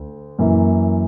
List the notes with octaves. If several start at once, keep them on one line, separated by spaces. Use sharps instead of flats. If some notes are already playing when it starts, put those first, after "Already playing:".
Already playing: D2
F#2 E3 A#3